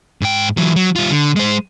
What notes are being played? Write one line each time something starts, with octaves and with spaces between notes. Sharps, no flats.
G#2 G5
E3 F#3
F#3
G3 F4
D3
G#3 C5